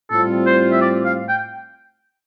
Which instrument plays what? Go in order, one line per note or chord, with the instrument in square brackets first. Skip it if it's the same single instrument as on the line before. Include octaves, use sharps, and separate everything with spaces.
[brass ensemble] A2 G3 C4 F4 [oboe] A4
[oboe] C5
E5
D5
F5
G5